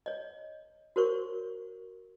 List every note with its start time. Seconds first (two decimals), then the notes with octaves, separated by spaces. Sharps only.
0.06 C#5 D#5
0.96 F#4 A#4 C5 C#5 C#6